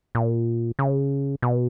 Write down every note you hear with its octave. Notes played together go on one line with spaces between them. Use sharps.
A#2
C#3
B2